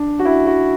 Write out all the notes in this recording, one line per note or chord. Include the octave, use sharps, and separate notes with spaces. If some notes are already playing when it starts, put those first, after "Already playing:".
Already playing: D4
F#4
E4
F#4